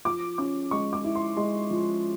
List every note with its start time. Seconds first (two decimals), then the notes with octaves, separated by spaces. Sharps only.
0.05 F3 D6
0.38 C#4 D6
0.71 G#3 C#6
0.93 D6
1.04 E4
1.15 C6
1.37 G#3 C6
1.70 F3